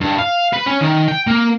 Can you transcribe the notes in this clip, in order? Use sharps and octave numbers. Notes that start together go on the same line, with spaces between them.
G2
F5
B4
C#4
D#3
G5
A#3